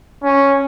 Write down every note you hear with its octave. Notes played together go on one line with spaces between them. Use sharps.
C#4